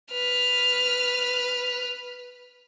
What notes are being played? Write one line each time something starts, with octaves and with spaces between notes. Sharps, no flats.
B4 F6